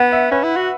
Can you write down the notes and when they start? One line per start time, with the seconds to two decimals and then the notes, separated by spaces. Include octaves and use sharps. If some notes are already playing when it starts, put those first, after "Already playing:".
Already playing: B3 F#5
0.12 E5
0.31 C#4 B4
0.43 E4
0.56 F#4